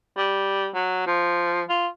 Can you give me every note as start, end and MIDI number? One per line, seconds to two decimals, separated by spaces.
0.17 0.69 55
0.75 1.07 54
1.07 1.62 53
1.69 1.87 65